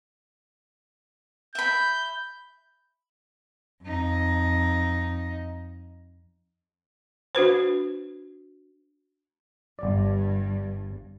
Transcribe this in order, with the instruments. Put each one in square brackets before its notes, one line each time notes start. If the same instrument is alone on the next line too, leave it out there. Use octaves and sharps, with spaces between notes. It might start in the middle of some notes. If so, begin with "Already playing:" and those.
[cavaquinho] E5 B5 [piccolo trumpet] G6
[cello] F2 D#4
[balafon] D4 F#4 B4 C5
[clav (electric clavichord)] G1 D5 [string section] G2